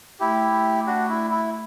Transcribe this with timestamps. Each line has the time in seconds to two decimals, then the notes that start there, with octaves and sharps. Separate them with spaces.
0.20 A3 E4 G4
0.53 A3
0.87 D4 F#4
1.09 E4
1.31 E4